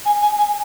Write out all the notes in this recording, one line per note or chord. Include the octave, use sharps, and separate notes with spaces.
G#5
G#5
G#5